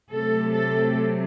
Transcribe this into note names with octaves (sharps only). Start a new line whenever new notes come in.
C3 F#3 A3 C4 A4
A4